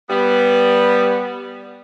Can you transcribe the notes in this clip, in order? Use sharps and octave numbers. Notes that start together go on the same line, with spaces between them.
G3 B3